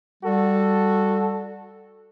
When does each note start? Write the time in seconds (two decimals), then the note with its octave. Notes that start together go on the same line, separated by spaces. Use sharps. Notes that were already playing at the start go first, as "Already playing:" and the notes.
0.23 G3 F#4 A4